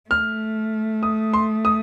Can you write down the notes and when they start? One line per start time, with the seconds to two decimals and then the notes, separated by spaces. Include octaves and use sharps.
0.10 A3 F6
1.03 D#6
1.33 C6
1.65 D#6